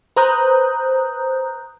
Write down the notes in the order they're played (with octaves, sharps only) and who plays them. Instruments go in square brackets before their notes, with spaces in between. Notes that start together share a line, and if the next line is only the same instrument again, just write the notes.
[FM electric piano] B4 C5 A#5 D#6 F#6 G6